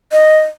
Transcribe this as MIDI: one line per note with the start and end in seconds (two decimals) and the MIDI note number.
0.12 0.39 75